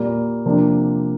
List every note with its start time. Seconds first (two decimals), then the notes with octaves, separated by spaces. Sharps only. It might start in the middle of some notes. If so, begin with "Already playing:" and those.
Already playing: A#2 G3 A#3
0.46 C3 F3 A#3 D4